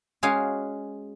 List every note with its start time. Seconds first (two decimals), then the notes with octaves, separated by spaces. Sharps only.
0.23 G#3 C#4 F#4 G#4 F5 G#5